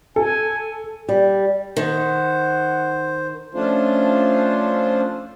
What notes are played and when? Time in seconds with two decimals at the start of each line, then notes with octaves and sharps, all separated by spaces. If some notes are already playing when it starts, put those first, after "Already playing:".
0.16 A4 G#5
1.09 G3
1.77 D#3 C5 F#5
3.54 F3 A3 C#4 D4 F4 C5